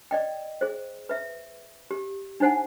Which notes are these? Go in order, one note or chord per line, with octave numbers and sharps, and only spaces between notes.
D5 D#5 G5
G#4 C5
B4 E5
G4
D4 D#4 C5 F#5 G#5